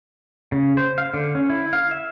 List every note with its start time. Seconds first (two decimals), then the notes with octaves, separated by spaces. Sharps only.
0.52 C#3
0.77 C5
0.98 F5
1.14 D3
1.35 C#4
1.49 E4
1.73 F5
1.91 E5